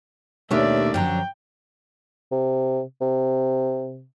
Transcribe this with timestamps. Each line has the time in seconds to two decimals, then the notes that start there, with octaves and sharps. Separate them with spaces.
0.51 D#2 B2 A3 C#4 D4 G4 D5 E5
0.94 F#2 D3 F3 G5 A#5
2.32 C3
3.01 C3